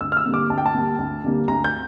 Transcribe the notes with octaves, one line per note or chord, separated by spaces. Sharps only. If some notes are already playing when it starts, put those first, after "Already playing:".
D2 E6
F6
E6
D3 G3 A#3
D6
D2 A5
G5
A5
D3 G3 A#3
D2
D3 G3 A#3
D2 A#5
G6